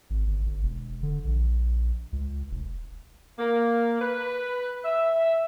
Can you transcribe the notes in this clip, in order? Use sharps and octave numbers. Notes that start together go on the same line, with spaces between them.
G#1
G1
G1
E1
D3
A#1
C#2
E1
A#3
B4
E5